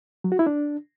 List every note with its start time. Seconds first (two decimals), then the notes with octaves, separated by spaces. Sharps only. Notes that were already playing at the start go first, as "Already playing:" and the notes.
0.24 F#3
0.32 F#4
0.39 E4
0.47 D4